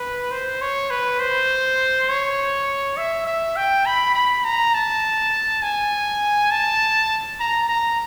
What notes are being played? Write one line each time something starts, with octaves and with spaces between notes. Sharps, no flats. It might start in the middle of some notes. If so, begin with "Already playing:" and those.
Already playing: B4
C5
C#5
B4
C5
C#5
E5
E5
G5
B5
B5
A#5
A5
G#5
A5
A#5
A#5